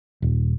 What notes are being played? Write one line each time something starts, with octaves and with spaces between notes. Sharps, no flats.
D#1